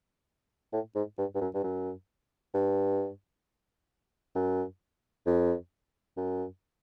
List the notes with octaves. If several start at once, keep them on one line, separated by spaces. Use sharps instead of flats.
A2
G#2
G2
G2
F#2
G2
F#2
G2
F#2
F2
F#2